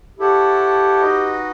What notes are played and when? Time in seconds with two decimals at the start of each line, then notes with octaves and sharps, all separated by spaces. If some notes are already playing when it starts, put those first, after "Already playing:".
0.19 E4 G4 A4 C#5 F#5 A5
1.01 D#4 F#4 B4 D#5